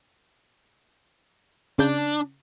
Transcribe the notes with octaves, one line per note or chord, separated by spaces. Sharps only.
C#3 D4 G6